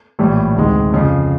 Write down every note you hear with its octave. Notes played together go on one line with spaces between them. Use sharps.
A#1 A2 E3 G3
D2 C3 D#3 G#3
F2 C#3 F3